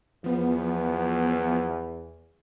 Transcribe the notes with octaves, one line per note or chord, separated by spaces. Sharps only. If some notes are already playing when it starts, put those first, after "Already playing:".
E2 F3 B3